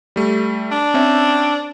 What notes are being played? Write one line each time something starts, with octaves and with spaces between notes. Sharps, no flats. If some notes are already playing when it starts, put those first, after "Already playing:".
G3 A3
D4
C4 C#4 E5